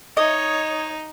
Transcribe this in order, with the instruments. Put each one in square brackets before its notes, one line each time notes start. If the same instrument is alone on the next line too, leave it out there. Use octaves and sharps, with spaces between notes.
[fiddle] D#4 [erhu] C#5 [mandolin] D#5